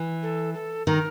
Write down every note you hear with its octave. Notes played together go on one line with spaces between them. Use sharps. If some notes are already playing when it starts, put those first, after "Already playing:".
Already playing: E3
A4
A4
D#3 A#4